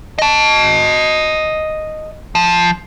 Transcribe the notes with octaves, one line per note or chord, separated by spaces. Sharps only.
D#5 A5
F3